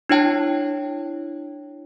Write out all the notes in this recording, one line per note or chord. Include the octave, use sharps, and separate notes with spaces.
D4 E4 C#5 G5 A5